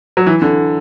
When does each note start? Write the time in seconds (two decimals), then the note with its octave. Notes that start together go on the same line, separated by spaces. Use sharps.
0.17 F#3
0.27 E3
0.42 D3